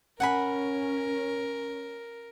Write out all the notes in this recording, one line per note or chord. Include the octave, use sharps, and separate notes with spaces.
C#4 A#4 F#5 G#5 B5